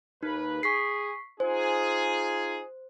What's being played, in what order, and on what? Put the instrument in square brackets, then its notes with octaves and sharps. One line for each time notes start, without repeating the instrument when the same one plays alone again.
[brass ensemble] D#2 B4 [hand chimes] D#4
[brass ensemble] G#4 [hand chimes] C#6 B6 C7
[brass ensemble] D#4 F4 G#4 [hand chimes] C5